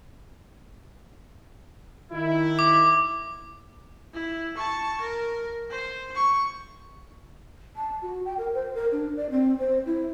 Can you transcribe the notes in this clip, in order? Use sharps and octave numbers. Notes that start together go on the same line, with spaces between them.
D#3 E4
D6
E4
A5 C#6
A#4
C5
C#6
A5
F#4
G5
A#4
C5
A#4
D4
D5
C4
C5
E4